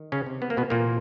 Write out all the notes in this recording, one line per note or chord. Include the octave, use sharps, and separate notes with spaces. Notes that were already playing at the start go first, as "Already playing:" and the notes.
Already playing: D#3
C#3 C#4
C3
B3
A#3
B2 B3
A#2 E3 A#3